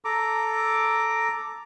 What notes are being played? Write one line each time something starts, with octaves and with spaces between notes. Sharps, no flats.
A4 A#5 D6